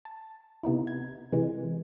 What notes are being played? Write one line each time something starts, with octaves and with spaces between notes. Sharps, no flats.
A5
C3 B3 D#4 E4
G#6
C3 E3 G#3